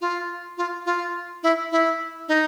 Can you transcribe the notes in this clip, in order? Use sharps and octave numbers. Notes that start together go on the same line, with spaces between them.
F4
F4
F4
E4
E4
D#4